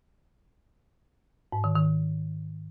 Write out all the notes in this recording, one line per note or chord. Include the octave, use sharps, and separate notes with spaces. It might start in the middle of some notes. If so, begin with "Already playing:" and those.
G#2
D#3
D#3